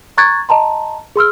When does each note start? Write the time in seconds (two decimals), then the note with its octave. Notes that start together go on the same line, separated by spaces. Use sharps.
0.18 A#5 C#6 F#6 G#6 A6
0.49 D#5 A5 A#5 C6
1.16 G#4 C6 E6 F6